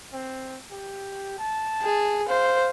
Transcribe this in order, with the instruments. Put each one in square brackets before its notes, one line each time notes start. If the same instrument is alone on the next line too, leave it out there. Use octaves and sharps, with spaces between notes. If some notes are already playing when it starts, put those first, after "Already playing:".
[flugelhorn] C4
G4
A5
[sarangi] G#4
[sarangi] C5 [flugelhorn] F5